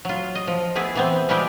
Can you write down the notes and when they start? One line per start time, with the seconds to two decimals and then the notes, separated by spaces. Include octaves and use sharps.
0.05 F#3 F4
0.35 D#5
0.47 F3
0.75 A3 B3 E4 G#4
0.95 E3 B3 C4
1.29 B2 G3 G#3 E4 G4